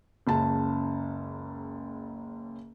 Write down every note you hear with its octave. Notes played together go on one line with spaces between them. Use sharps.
F#1 C#2 A5